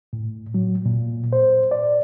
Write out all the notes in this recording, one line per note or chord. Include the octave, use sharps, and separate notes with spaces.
A2
F#3
A#2
C5
D5